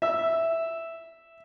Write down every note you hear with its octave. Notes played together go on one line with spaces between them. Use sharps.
E5 E6